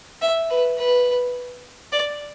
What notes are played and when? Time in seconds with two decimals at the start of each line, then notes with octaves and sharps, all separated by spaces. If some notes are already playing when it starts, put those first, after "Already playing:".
0.22 E5
0.50 B4
0.79 B4
1.92 D5